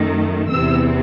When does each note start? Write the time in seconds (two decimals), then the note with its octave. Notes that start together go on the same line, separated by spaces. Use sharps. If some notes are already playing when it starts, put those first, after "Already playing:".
Already playing: F#2 D#3 A3
0.50 E2 C3 E3 C4 E6